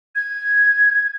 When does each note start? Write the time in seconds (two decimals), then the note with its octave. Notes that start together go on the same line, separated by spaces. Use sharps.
0.15 G#6